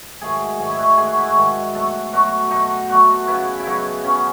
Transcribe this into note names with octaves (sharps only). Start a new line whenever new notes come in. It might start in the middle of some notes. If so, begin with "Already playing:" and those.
G#2 D#3 F#3 A3 G#4
G#2 D#3 F#3 A3 G#4
E4
F#4
G#2 D#3 F#3 A3 G#4
F#4
E4
F#4
G#2 D#3 F#3 A3
B2 F#3 A3 A4
B2 F#3 A3 F#4
B2 F#3 A3 D#4
B2 F#3 A3 F#4
C#3 F#3 B3 E4
E4
C#3 F#3 B3 D#4
C#3 F#3 B3 C#4